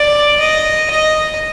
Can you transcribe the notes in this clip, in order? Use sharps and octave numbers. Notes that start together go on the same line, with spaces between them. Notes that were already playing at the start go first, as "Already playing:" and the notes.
Already playing: D5
D#5
D#5